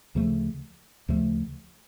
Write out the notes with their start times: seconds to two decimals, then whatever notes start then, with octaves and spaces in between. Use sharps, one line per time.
0.15 D2 C#3 F3 A3
1.08 D2 C#3 F3 A3